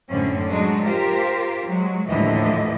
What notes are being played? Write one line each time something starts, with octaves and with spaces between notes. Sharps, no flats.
F#2 A2 D3 C4 C#4
F#3 G#3 D4 D#4
F4 G4 A#4 C5
F#3 G#3
D#2 A2 D3 E3 F3 D#5